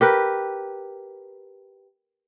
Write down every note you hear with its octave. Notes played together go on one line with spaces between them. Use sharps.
G4 A#4 B4